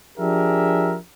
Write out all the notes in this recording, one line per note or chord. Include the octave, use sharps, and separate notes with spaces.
F3 D4 G4 G#4 A#4 E5